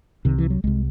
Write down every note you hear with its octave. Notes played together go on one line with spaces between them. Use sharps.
C2 C3 D#3
E3
F#3
C2 C3 G#3